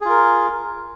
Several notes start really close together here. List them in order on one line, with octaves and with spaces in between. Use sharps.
G#4 F4 A#4